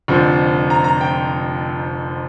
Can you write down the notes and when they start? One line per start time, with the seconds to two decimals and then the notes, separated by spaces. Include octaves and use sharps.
0.08 F1 F2 D3 F3
0.70 A#5
0.84 A#5
1.01 G5